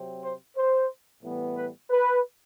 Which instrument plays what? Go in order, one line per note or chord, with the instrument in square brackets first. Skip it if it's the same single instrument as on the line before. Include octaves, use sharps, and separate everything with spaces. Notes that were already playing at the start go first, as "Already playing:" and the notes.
Already playing: [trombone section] C3 F#3 C4
C5
C5
A2 E3 G3 B3
B4
B4